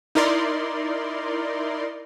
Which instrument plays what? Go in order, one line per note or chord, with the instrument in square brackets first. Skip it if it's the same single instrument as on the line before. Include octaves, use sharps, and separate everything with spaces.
[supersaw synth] D#4 E4 A#4 D5 C6